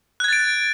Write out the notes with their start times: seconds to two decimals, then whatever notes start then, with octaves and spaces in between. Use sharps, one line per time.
0.20 F#6
0.24 G#6
0.28 A6
0.33 D7